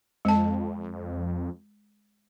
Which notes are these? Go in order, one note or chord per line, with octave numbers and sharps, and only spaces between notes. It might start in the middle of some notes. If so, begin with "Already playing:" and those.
F2 G#3 A5